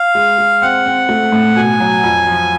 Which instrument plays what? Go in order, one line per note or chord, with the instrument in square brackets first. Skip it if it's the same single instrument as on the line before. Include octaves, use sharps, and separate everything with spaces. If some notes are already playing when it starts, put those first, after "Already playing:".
Already playing: [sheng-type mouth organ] F5
[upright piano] G#3
G#3
[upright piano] C4 [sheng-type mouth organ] F#5
[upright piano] C4
A3
A2
[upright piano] B2 [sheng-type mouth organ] G#5
[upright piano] F#3
F2
F3